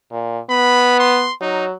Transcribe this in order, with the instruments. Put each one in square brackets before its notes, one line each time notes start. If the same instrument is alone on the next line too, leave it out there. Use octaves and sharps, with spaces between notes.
[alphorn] A#2
[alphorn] B3 [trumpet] B5
[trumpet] C6
[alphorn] F#3 [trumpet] D#4